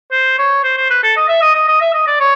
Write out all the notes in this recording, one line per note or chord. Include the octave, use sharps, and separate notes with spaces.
C5
C#5
C5
C5
B4
A4
D#5
E5
D#5
D#5
D#5
E5
D#5
D5
C#5